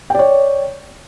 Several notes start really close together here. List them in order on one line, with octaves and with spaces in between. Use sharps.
G5 D5 C#5